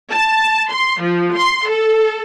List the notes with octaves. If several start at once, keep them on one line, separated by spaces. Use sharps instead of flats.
A5
C6
F3
C6
A4